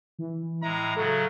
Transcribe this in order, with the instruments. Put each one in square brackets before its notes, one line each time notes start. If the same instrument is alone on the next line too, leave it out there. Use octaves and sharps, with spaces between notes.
[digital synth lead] E3
[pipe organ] A2 G#3 [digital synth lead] E5 [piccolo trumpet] A#5
[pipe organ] C#3 F#3 [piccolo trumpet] F#4 [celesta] A4